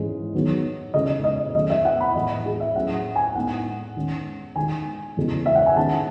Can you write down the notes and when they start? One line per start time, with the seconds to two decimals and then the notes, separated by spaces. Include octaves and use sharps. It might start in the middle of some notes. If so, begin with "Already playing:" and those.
Already playing: G#2 E3 G#3 C#4
0.34 D#3 F#3 B3 D#4
0.94 C#3 G#3 C#4 D#5
1.24 D#5
1.54 D#3 F#3 A3 C#4 D#5
1.70 E5
1.85 F#5
2.01 B5
2.15 A2 E3 G#3 D#5
2.46 G#4
2.60 E5
2.75 A2 F#3 C#4 F#5
3.16 G#5
3.35 A2 G#3 B3 D#4 F#5
3.96 D#3 G#3 C#4
4.56 D#3 G#3 D#4 G#5
5.17 E2 C#3 G#3 C#4
5.46 E5
5.56 F#5
5.66 G#5
5.77 D#3 G#3 C#4 A5